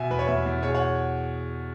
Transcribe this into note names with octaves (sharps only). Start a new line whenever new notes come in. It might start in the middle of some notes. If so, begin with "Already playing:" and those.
Already playing: B2 E5 G#5
E2 B4
C#5
E2 B4 E5
E2
B2 G#4 C#5
C#5 F#5